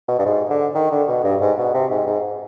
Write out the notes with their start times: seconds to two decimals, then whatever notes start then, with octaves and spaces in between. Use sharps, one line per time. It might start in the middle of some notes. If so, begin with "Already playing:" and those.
0.08 B2
0.19 G2
0.25 G#2
0.50 D3
0.75 D#3
0.91 D3
1.08 B2
1.24 G2
1.41 G#2
1.58 B2
1.74 C3
1.91 G#2
2.07 G#2